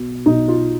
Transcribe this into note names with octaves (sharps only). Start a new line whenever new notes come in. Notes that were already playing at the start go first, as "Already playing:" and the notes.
Already playing: B1 B2
B1 D#4
F4